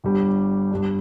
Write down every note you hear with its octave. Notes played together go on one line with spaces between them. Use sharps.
G1 G2 G3 D4
G2 G3 D4